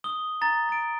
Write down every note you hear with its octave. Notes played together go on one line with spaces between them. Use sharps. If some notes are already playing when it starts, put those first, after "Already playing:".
D#6 G7
A#5 A6
A6 D7